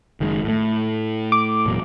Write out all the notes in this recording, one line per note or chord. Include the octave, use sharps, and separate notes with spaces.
F#1 D#3 G#3
A2 A3
D6
E1 A#2 F#3